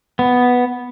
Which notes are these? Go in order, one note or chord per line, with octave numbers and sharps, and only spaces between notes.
B3